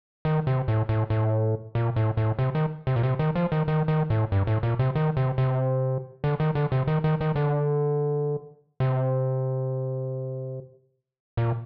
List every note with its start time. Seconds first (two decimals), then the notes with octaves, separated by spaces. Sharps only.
0.25 D#3
0.47 C3
0.68 A2
0.89 A2
1.10 A2
1.75 A#2
1.96 A2
2.17 A2
2.39 C3
2.55 D#3
2.87 C3
2.96 A#2
3.03 C3
3.19 D#3
3.35 F3
3.52 D#3
3.68 D#3
3.88 D#3
4.10 A2
4.32 G2
4.47 A2
4.63 A#2
4.79 C3
4.95 D#3
5.17 C3
5.38 C3
6.24 D3
6.40 D#3
6.55 D3
6.72 C3
6.87 D#3
7.04 D#3
7.21 D#3
7.36 D3
8.80 C3
11.37 A#2